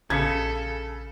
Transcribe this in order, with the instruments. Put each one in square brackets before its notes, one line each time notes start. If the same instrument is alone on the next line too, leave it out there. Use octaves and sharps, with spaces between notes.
[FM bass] A#1 [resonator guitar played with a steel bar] C#3 [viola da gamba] A4 [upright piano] G#6 B6 C#7